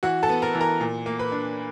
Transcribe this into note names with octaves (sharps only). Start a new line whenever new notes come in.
E3 F#4 F#5
A4 A5
B3
A#4 A#5
E3
A#4 A#5
A#2
A#3
B4 B5
D4